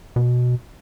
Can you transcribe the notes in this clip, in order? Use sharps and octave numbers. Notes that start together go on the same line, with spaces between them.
B2